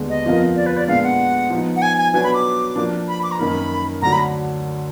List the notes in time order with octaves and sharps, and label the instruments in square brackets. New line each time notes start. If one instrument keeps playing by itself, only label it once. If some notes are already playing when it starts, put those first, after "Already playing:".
Already playing: [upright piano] D#2 D3 G#3 B3
[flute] D#5
[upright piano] F2 F3 B3 F4 A#4
[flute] D5
B4
D5
[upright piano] A#2 G#3 B3 D4 [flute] F5
[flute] F#5
[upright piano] F3 B3 D#4
[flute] F#5
G#5
G#5
[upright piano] B2 F#3 D4 F#4 B4 [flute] G#5
[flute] B5
D6
[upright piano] F3 A#3 D4
[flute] B5
D6
A#5
[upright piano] F#2 D#3 A#3 D#4 A#4 [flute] B5
[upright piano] D2 D3 F#3 [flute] A#5
[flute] B5